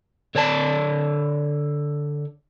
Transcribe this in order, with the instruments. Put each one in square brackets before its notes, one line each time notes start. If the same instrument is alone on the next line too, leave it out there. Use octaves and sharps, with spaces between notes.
[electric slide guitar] D3 C#5 D5 A5